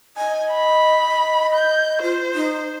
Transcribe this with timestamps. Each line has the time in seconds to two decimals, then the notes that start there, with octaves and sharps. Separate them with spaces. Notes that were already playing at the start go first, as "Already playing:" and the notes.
0.17 D#5 G#5
0.52 B5
1.54 G6
2.02 F4 C5
2.34 D#4